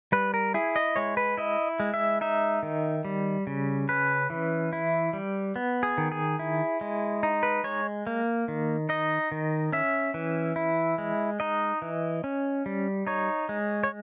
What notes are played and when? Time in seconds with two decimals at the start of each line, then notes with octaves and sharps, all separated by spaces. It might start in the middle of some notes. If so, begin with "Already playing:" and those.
0.12 G3 B4
0.34 A#4
0.54 E4 G#4
0.76 D#5
0.96 G#3 C#5
1.17 B4
1.37 E4 D#5
1.80 G#3
1.94 E5
2.21 D#4 E5
2.63 D#3
3.05 G3
3.47 C#3
3.89 C#4 B4
4.30 E3
4.73 E4
5.13 G3
5.56 B3
5.83 G#4
5.98 D#3
6.12 G#4
6.39 E4
6.81 G#3
7.23 D#4
7.43 B4
7.64 G#3 C#5
8.07 A#3
8.48 D#3
8.89 D#4 D#5
9.32 D#3
9.72 C#4 E5
10.14 E3
10.56 E4
10.98 G#3
11.40 D#4 D#5
11.82 E3
12.24 C#4
12.66 G3
13.07 D#4 C#5
13.49 G#3
13.84 C#5